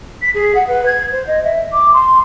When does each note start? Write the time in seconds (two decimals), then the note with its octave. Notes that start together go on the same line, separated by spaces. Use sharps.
0.22 B6
0.34 G#4
0.54 F#5
0.67 B4
0.85 G#6
1.11 C5
1.27 D#5
1.43 E5
1.72 D6
1.93 C6